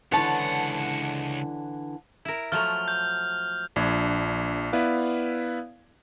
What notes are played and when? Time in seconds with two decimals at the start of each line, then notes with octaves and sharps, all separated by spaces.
0.12 C#2 D3 E3 C#5 F#5 A5
2.25 E4 A#4
2.52 F3 F#3 A3 F6 F7
2.88 G6
3.76 A#1 D4 G#6
4.73 B3 E4 B4 D5 F5